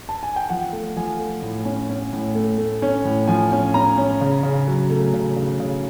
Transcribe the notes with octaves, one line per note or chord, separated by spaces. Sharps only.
A5
G#5
G5
F3 F#5
A3
F3 G#5
A3
A2
C#4
C#4
A2
A3
A3
C#4
A2
F3 G#5
C#4
C#4 A#5
C#4
C#3
C#3
F#3
A3
C#3
C#3
C#3